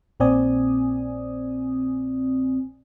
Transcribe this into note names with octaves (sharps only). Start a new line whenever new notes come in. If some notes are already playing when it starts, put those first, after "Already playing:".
A#1 A#2 C4 D5 G#5 D#6